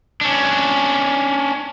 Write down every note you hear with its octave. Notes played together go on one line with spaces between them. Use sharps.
C#4 D4